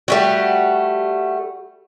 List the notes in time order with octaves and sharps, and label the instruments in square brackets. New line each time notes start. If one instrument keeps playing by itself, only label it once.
[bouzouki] G3 A3 F#4